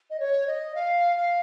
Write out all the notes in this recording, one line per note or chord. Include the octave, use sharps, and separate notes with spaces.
D#5
C#5
D#5
F5
F5